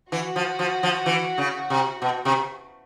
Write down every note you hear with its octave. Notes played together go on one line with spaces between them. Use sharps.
E3 F#4
F3
F3
F3
E3
C#3
C3
B2
C3